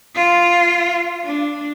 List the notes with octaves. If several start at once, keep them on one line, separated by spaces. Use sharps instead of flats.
F4
D4